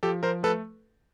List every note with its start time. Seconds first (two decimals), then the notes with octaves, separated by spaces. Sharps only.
0.03 F3 G4 A4
0.23 F3 A#4 C5
0.43 A3 A4 B4